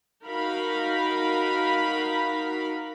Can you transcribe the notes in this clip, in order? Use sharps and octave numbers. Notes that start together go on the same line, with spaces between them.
D#4 F#4 A#4 F5 B5